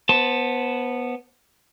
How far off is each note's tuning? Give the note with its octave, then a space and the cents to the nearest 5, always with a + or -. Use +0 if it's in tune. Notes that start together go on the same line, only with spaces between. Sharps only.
B3 -10 C5 +15 A5 +0